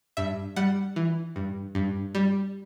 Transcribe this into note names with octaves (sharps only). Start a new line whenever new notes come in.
G2 E5
G3 F#5
E3
G2
G2
G3